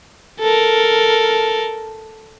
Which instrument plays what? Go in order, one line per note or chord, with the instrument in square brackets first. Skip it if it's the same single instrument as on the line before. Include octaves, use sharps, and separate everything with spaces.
[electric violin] A4 A#4